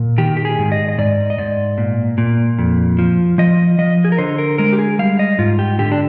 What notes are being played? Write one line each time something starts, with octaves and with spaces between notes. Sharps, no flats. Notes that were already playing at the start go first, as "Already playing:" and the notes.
Already playing: A#2
D#3 G4
G4
G#4
G#2
D#5
D#5
G#2 D5
D#5
G#2 D5
A#2
A#2
F2
F3
F3 D#5
F3 D#5
G#4
A#4
D3 C5
A#4
G#3 A#4
G4
G#4
G3 F5
D#5
G#2 F4
G4
D3 G4
D4